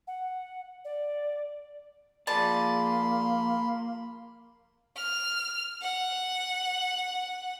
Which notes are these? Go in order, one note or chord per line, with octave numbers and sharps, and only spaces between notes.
F#5
D5
F3 A#3 G#4 D5 A5 B5 C6
F6
F#5